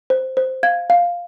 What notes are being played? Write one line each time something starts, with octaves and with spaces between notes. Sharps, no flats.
C5
C5
F5 G#6
F5